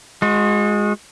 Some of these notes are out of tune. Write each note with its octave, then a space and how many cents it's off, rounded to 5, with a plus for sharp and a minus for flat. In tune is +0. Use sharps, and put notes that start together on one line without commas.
G#3 +0 F#4 -40